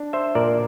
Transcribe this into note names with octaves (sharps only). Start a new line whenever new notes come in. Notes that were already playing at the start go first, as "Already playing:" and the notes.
Already playing: D4
C5 E5
A#2 A#4 D5